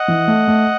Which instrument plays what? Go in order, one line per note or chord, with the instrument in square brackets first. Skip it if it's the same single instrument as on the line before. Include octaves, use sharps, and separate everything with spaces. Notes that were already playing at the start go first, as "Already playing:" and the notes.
Already playing: [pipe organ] D#5 F#5
[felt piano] E3
A3
A3